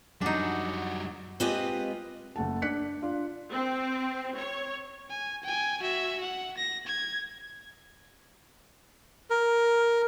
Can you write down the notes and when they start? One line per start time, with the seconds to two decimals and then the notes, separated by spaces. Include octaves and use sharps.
0.21 F#2 G3 D4 D#4 F#4
1.40 G#3 C4 F4 G4 B4 D#5
2.36 F#1 A3 F#5 A5
2.62 D4 D5 F#6 B6 C#7
3.02 D4 F4
3.51 C4
4.37 C#5
5.10 G#5
5.43 G5 G#5
5.80 F#4 E5
6.21 F#5
6.57 A#6
6.87 G#6
9.30 A#4